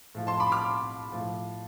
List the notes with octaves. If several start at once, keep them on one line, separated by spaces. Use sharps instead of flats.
A2 F3
A5 C6
B5 D6
D6 F6
A2 F3